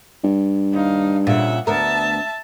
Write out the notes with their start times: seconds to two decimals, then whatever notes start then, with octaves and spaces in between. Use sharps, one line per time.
0.24 G2
0.74 D#2 D#4 F5
1.27 A#2 C#3 E5 F#5
1.67 D2 B3 A#4 E5 A5